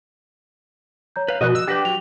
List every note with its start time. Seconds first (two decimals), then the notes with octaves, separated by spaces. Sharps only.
1.16 C#5 A#5 G6
1.28 B4 F5
1.41 B2 F3 F#4 D#5 D#6 F#6
1.55 E6
1.67 D4 G4 B4 F#5 G5 A#6
1.85 F#3 F7